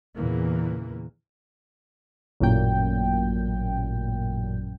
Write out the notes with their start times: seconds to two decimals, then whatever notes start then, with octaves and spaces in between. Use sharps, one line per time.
0.16 E2 A#2 C#3 E3 A#3
2.40 A1 F#2 A#2 G5